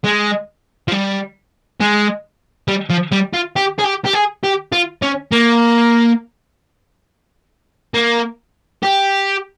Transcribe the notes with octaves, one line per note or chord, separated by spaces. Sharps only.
G#3
F3
G3
G#3
G3
F3
G3
F4
G4
G#4
G4
G4
G#4
G4
F4
C#4
A#3
A#3
G4